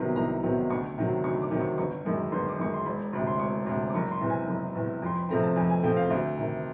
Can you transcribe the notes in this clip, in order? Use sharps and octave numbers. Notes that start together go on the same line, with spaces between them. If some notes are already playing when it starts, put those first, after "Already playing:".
Already playing: C2 C3 D#3 F#3 B3
C2 A#5
C3 D#3 F#3 B3
D2 C#6
C3 D#3 F#3
D2 C#6
D6
C3 D#3 F#3
C#6
G1 C#6
F#2 D#3 G#3
G1 C6
D6
F#2 D#3 G#3 C#6
C6
E1 B5
D2 C3 B5
C6
E1 C#6
D2 C3
D6
F#1 C#6
C6
E2 C3
G#5
F#1
E2 C3
F2 C6
B5
C3 F3 A3 C4 A#5
A5
F2 G#5
G#5
C3 F3 A3 C4 G5
F5
D2 E5
C3 D#3